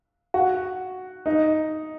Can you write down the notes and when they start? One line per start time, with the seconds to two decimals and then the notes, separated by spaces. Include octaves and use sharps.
0.34 F#4
1.26 D#4